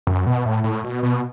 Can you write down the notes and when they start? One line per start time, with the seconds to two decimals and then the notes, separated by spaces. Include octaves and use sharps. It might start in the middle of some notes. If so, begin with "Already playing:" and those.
0.07 F#2
0.26 B2
0.46 A2
0.64 A2
0.84 B2
1.03 B2